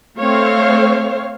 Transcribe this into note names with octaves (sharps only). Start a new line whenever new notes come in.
A3 C4 C#5 F5